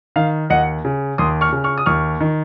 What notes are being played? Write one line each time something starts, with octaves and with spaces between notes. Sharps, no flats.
D#3 F5
D#2 D#5 F#5
C#3
D#2 C6 D#6
C#6 F6
C#3
C#6 F6
D#6
D#2 C#6 F6
D#3